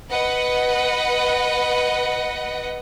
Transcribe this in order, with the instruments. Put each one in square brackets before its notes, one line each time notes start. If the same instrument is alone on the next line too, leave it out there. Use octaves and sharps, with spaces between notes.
[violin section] B4 D#5 F#5